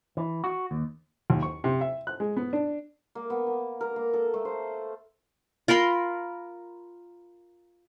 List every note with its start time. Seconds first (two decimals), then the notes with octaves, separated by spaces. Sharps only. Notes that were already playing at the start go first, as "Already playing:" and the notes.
0.17 E3
0.44 F#4
0.71 D#2
1.30 D#2
1.42 C#6
1.64 C3
1.81 E5
2.07 F#6
2.20 G#3
2.37 B3
2.53 D4
3.15 A#3
3.30 B3
3.47 A#3
3.81 A#4
3.96 A#3
4.14 A4
4.34 A3
4.45 C5
5.68 F4 A#4 B5 C6